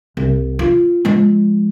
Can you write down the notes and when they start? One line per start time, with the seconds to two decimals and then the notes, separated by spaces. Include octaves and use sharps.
0.17 C2
0.59 F4
1.05 F3 G#3